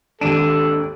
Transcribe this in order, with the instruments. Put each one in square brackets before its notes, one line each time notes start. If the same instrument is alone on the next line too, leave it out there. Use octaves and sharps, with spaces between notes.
[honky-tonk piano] G#1 D#2 D#7 [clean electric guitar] D4 [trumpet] A4